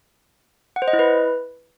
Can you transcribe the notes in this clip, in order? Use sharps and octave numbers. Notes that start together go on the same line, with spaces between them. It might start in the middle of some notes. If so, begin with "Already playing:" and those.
F#5
C5
D#5
E4
B4